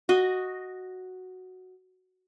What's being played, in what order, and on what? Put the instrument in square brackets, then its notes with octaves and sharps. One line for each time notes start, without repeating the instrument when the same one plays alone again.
[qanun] F#4 D#5